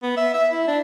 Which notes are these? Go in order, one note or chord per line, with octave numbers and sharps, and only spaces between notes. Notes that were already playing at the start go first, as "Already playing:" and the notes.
B3
E5
E5
E4
D4